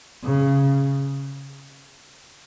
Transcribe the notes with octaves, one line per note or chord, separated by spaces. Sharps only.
C#3